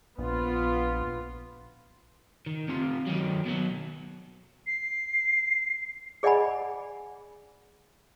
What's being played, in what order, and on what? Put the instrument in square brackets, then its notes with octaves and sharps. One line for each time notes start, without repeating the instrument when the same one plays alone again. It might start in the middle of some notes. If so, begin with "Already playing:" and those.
[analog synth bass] A#1 [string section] B3 F4
[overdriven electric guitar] D#3
C3 F4
D#3 F#3
B2 F#3
[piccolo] C7
[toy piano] G#4 D5 D#5 F#5 G#5 B5